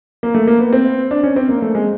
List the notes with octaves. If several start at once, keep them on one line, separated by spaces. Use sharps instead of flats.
A#3
A3
A#3
B3
C4
D4
C#4
C4
A#3
A3
G#3